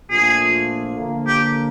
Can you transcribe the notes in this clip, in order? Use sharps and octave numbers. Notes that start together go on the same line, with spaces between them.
A#2 F3 A3 D4 F4 G#4
D3 F3 A#3
G4